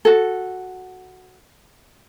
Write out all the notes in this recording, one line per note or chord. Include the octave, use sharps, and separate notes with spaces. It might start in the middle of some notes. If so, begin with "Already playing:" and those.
F#4 A4